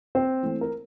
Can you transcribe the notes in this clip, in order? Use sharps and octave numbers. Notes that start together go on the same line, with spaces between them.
C4 C5
E3 A3 C4
A#4